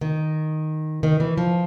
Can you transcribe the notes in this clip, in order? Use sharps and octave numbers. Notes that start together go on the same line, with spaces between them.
D#3
D#3
E3
F3